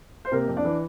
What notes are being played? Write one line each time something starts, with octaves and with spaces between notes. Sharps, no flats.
C5
C3 A#3 A#4
F2
D4 D5
E3